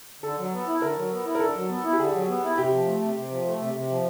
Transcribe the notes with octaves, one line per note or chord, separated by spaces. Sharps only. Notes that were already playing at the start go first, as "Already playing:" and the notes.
D3 A4
F#3
B3
E4
D3 A#4
F#3
B3
E4
A#4
D3 A4
F#3
B3
E4
G4
D3 G#4
F#3
B3
E4
C3 G4
F3
A3
C3
C3
F3
A3
C3
C3
F3